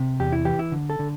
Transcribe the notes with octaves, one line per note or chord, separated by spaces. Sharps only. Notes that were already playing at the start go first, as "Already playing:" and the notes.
Already playing: C3
E2 G4
E4
E3 G4
E4
D3
A4
D3